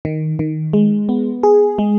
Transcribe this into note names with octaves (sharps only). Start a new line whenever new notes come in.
D#3
D#3
G#3
B3
G#4
G#3